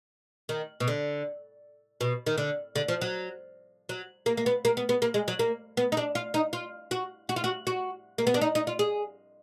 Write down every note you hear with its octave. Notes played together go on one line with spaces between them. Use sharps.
D#3
B2
D3
B2
D#3
D3
D3
F3
F#3
F#3
A#3
A#3
B3
A#3
B3
B3
A#3
G#3
F#3
A#3
B3
D#4
D4
F4
D#4
F4
F#4
F#4
F4
F#4
F#4
A#3
B3
D4
D#4
D#4
F4
G#4